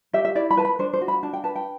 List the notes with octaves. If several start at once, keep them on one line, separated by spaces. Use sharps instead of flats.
G4 E5
E5
E4 D5
B5
B4 A5
B5
D4 C5
C5
F#4
B5
D4 A5
G5
B4 A5
G5